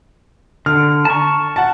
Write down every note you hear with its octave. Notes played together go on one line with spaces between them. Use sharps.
D3 F6
A5 A#5 C#6
F#5 A5